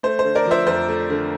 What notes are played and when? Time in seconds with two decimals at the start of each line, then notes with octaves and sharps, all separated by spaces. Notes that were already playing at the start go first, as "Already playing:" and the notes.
0.03 A3 C5
0.19 C5
0.24 D3
0.35 A#4 D5
0.45 F3
0.51 C5 E5
0.67 F2 C5
0.88 A3
1.10 D3